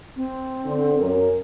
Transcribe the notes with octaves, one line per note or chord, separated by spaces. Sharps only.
C4
D3
F#2 A#4